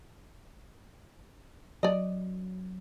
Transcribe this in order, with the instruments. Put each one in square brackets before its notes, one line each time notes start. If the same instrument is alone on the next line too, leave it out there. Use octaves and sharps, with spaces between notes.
[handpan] F#3 [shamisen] D5 D#5